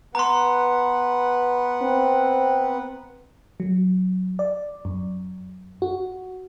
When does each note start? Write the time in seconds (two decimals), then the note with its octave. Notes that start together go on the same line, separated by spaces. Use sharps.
0.15 B3 B4 F#5 A#5 C6
1.82 C4
3.60 F#3
4.39 D5
4.85 F#2
5.82 F#4